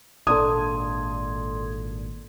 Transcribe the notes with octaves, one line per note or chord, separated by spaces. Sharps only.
G#1 A#2 D4 A4 D5 C6 D#6 G#6